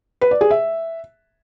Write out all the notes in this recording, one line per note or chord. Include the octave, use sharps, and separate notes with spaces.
B4
D5
G#4
E5